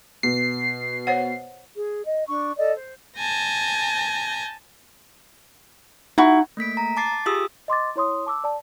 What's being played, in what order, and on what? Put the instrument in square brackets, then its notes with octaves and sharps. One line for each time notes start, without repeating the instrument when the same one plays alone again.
[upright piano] B2 [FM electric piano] C7
[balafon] C5 C#5 F#5
[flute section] G#4
D#5
D4 C#6
A4 D5 D#5
C5
[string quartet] G#5 A5 G6 A#6
[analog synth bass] D#4 [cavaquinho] E4 F#4
[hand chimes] A3 A#3 B6 D7
A#5
A5 D6 A6 C7
F4 G4 G#4 D#6 E6
[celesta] D#5 C6 D6 A6
E4 C#5 C6 D#6
A5 D6 E6
D5 A5